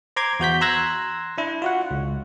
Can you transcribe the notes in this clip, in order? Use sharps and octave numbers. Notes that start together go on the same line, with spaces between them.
C5 A#5 C6 D6 G#6
E2 F#4 G6 B6
A#5 C6 E6 F#6 G#6 A#6
D4 E4
F4 F#4 F#5
C#2